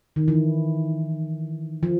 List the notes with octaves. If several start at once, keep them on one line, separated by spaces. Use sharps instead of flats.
D#3
E3
F3